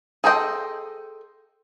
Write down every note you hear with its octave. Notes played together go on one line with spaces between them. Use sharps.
G#4 A4 C5 D#5 G5